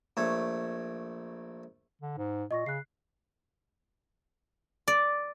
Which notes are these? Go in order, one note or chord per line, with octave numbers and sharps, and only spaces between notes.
A#1 A3 C#5
D3
G#2
A#2 D#5 C#6 A#6
C#3 F#6 C7
D5